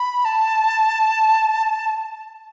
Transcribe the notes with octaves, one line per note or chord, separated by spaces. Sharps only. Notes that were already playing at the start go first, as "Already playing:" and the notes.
Already playing: B5
A5